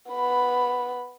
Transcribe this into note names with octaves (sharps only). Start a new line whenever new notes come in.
B3 B5